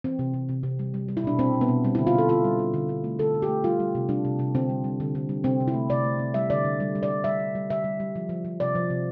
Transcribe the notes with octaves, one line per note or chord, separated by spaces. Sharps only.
E3 C4
C3
C3
C3
C3
G3
G3
G3
E4
B2 D4
B2 C4
B2
B3
B2
G3 C4
E4
D3
F4
D3 A4
D3 F4
G3
G3
D3
D3
A3
D3 A4
D3
G4
A3
G3 F4
G3
C3
G3 D4
C3
C3
D3 C4
G3
G3
D3
D3
G3
C3 C4
C3
E4
A3
C3 D5
A3
C3
G3 E5
D3 D5
D3
G3
G3
D5
G3
G3 E5
G3
G3
D3 E5
G3
G3
F3
F3
F3
C3 D5
F3
C3